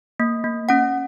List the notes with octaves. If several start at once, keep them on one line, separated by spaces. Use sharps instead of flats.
A#3
A#3
C#4 F#5